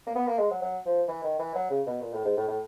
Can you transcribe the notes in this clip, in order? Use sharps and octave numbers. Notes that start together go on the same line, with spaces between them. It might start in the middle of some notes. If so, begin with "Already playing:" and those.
A#3
B3
A#3
G#3
F#3
F#3
F3
E3
D#3
E3
F#3
C#3
B2
A#2
A2
G#2
A2
A2